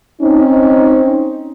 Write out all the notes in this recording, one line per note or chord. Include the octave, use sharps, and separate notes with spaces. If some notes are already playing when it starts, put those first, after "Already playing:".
C4 C#4 D#4